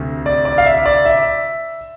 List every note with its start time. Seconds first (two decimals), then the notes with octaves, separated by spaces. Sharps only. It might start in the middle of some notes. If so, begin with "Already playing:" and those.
Already playing: D2 C3
0.26 D5
0.45 D5
0.58 F5
0.66 E5
0.86 D5
1.05 E5